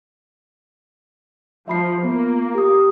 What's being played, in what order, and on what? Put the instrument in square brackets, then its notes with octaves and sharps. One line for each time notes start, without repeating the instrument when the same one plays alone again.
[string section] F3 [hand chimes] E5 B5 C7
[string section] A#3 [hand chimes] B3 F4
[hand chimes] G4 D#6